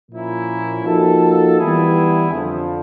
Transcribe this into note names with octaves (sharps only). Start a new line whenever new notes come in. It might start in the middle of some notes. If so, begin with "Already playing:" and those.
A#2 F3 A#3 C#4 E4
F3 A#3 D#4 F#4 A4
E3 G3 B3 E4 G#4
F2 D3 F3